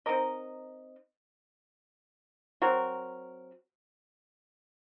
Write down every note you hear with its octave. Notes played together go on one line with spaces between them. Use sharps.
C4 D#4 A#4 D#5
F#3 C4 F#4 A#4